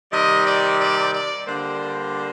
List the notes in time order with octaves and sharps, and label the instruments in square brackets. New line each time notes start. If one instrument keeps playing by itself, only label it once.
[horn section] C3 D#3 G3 D#5
D5
D5
D5
D3 G3 A#3 C5